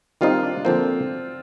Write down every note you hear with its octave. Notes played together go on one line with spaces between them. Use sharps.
D#3 G3 C4 D#4 F4
D4
D3 F3 A#3 C4